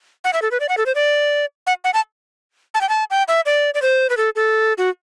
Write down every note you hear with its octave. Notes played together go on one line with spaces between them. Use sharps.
F#5
E5
A4
B4
D5
F#5
A4
C5
D5
F#5
F#5
A5
A5
G5
A5
G5
E5
D5
D5
C5
B4
A4
A4
F#4